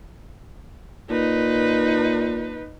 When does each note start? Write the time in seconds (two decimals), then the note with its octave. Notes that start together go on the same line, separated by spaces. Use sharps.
1.10 A#2 D#4 B4